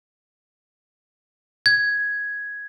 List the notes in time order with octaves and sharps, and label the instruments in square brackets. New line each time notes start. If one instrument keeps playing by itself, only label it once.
[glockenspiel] G#6